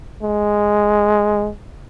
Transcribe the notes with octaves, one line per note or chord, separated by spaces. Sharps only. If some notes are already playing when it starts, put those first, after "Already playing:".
G#3